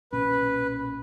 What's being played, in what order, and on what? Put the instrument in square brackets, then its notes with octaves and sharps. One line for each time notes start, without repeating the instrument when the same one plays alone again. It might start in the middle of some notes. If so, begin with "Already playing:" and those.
[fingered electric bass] B1 A#2 C#4 [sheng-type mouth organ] B4